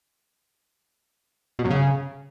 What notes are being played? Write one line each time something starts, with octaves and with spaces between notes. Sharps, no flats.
B2
F#2
C#3